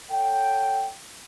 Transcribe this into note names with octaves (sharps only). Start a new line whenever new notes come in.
A4 C#5 F#5 G5